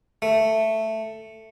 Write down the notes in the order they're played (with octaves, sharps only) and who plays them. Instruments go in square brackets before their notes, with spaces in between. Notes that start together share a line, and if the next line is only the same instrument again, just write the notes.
[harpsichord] A3